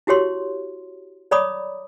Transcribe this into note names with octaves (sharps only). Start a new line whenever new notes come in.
E4 F#4 G4 C#5 C6
C#5 D5 A#5 B5 D6 D#6